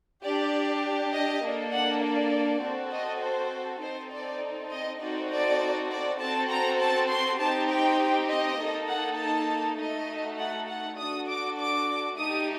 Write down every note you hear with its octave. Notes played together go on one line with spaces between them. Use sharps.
D4 G4 D5
D#5
A#3 D4 A4
F#5
D5
C4 F#4 A4
D#5
C5
C4 D#4 A4 C5
D5
D#5
C4 D#4 F#4 A4 D5
D5
D5
C4 F#4 A4 A5
A#5
A5
C6
C4 D#4 G4 A5
G5
D#5
A#3 D#4 A4
F#5
A5
A3 D#4 F#4 A4 D#5
F#5
F#5
D4 F#4 A4 D#6
D6
D6
A3 D#4 G4 D#6